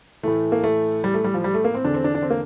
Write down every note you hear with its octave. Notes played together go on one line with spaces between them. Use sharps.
A2 E3 A3
A#3
A3
G3
A3
G3
F3
G3
A3
A#3
C4
E2 D3 D4
C4
D4
D4
C4
A#3